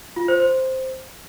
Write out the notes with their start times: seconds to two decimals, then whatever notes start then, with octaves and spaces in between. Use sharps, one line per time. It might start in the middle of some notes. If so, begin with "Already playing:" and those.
0.16 F4
0.28 C5
0.40 C5